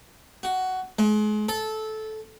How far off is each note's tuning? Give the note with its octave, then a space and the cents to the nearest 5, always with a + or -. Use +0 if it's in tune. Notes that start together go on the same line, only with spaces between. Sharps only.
F#4 +10
G#3 +35
A4 -15